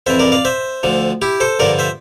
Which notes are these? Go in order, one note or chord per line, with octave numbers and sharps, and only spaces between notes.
F2 E3 C5 E5
A#4 D5
D5 F5
C5 E5
D2 D3 F3
E4 G4
A4 C5
G2 D3 F3 A#4 D5
C5 E5